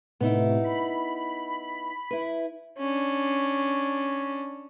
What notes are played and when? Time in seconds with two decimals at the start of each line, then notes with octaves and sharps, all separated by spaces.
0.20 A2 C3 B3 D#4 E4
0.64 B5
2.11 E4 B4
2.78 C#4 D4